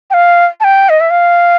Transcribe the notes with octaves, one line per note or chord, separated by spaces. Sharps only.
G5
F5
A5
G5
D#5
E5
F5